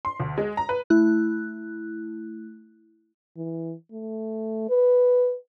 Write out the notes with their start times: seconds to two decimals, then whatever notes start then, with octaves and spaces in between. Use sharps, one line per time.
0.05 C6
0.20 D2
0.38 G#3
0.57 A#5
0.69 B4
0.90 A3 E4 F#6
3.37 E3
3.92 A3
4.69 B4